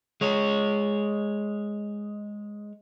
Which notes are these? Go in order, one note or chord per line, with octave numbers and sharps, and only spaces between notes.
G#3 C#5